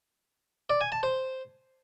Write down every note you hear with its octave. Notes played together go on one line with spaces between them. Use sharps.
D5
G#5
A5
C5